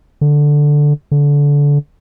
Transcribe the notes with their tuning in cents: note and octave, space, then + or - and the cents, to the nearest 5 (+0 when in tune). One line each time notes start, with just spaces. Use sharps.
D3 +0
D3 -25